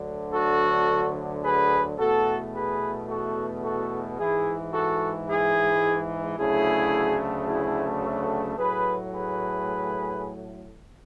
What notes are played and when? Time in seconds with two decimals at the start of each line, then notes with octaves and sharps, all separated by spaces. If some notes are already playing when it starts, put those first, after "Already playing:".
Already playing: D2 D3 F#3
0.34 F#4 A4
1.43 G#4 B4
1.99 E2 B2 A3 F#4 A4
2.54 G#4 B4
3.09 F#4 A4
3.64 F#4 A4
4.18 G#2 E3 G#3 E4 G#4
4.73 F#4 A4
5.29 E4 G#4
6.38 D2 C#3 F#3 A3 E4 G#4
7.48 E4 G#4
8.03 F#4 A4
8.57 A2 F#3 A3 G#4 B4
9.13 G#4 B4